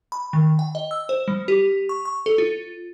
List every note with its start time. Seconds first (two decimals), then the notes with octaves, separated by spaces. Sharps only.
0.12 B5
0.33 D#3
0.59 G5
0.75 D#5
0.91 E6
1.09 C5
1.28 G3
1.48 G4
1.89 C#6
2.05 C#6
2.26 A4
2.38 F4